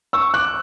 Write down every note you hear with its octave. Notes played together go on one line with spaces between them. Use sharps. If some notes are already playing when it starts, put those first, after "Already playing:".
C#6 E6
D6 F#6